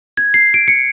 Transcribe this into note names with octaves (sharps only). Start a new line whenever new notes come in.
G#6
C7
D7
C#7